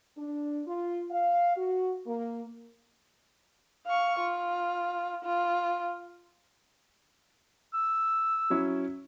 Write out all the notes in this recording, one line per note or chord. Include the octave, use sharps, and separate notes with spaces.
D4
F4
F5
F#4
A#3
F5 C#6
F4
F4
E6
F#3 C#4 E4